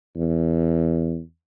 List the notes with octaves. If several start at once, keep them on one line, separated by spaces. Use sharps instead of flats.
E2